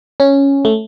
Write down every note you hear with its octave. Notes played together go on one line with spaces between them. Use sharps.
C#4
A3